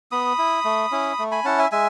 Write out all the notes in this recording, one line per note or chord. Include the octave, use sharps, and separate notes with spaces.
B3 B5 D#6
E4
A3
C#4 E4
A3
G#5 B5
C#4 E4 F#5 A5
E5 G#5
G#3 E5 G#5